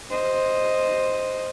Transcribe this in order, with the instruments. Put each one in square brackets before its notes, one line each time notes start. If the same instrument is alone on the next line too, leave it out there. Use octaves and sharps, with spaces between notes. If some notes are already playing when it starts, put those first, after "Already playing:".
[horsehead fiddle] C5 D#5